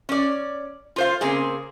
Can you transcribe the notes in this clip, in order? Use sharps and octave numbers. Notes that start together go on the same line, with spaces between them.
C#4 D5
F4 C5 F5
C#3 A#3 C4 G#4